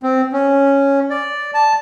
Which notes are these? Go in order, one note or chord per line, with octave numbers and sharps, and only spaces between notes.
C4
C#4
D5
A5